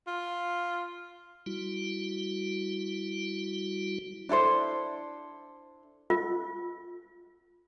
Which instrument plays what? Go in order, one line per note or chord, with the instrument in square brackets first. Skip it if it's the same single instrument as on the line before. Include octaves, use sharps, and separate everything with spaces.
[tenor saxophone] F4
[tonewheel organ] G3 E4 F#4
[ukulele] D4 E4 A4 C5
[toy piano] F4